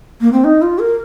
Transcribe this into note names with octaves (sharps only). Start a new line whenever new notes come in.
A#3
C4
D#4
F4
A#4